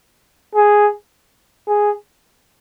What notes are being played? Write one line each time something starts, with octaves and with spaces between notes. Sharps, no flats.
G#4
G#4